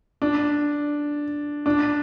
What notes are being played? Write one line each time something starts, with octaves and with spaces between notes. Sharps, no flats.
D4
D4